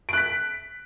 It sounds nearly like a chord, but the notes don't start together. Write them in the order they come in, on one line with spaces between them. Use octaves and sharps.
D7 F#6 B6